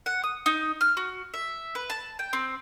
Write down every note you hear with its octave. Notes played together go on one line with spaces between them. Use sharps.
F#5
D#6
D#4
F6
F#4
E5
B4
A5
G5
C4